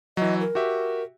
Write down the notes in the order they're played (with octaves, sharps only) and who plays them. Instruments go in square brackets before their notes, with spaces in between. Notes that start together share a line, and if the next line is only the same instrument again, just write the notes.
[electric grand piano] E3 F#3 [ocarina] D#5
[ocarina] A#4
[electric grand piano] F#4 G4 E5